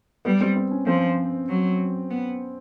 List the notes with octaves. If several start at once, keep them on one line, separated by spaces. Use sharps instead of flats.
G3 B3
C4
C4
C#4
F3 C4
F#3
B3